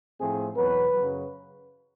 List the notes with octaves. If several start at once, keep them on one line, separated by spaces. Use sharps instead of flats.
A2 F3 A3 C4 G#4
E2 B2 F#3 B4
F#2 C#3 F#3